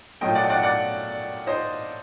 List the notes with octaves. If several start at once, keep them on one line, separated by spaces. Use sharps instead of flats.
A#2 F#3 A3 D#5 G5
D5 F#5
G5
D5 F#5
D5 F#5
C5 D#5